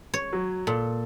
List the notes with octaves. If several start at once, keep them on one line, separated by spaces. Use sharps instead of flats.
C#5
F#3
A#2 A4